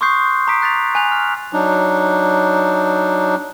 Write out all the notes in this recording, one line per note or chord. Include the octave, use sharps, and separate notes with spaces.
C6 C#6 D#6 F#6 G6 C7
A#5 D6 D#6 B6 D7
F#6 A6 B6 F7
G#5 F#6 F7
F6
F#3 D4 D#4